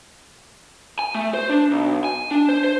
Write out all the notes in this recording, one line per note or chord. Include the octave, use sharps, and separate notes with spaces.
G#5
A3
C5
D4
B1
G#5
D4
C5
C5